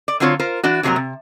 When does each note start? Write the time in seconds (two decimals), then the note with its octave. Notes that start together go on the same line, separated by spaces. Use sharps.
0.08 D5
0.20 D3 F#3 C4 F4 A4 C#5
0.39 F4 A#4 C5
0.63 E3 D4 F#4
0.83 F2 C3 F#3 A#3 A#5
0.96 C3